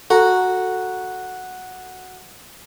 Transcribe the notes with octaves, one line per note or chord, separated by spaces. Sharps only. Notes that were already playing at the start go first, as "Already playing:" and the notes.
F#4 A4 A#5